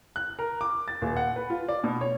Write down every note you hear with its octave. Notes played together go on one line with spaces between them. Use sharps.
F#6
A#4
D6
A6
D#1
F#5
B4
F4
D5
B2
C#5